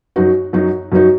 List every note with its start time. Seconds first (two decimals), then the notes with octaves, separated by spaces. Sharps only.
0.16 F#2 F#3 D#4 F#4
0.53 F#2 F#3 D#4 F#4
0.92 F#2 F#3 D#4 F#4